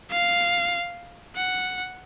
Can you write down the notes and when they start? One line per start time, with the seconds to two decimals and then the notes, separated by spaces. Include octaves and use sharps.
0.11 F5
1.36 F#5